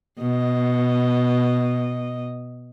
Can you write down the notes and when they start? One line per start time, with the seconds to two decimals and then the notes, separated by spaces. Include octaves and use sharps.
0.19 B2 D#5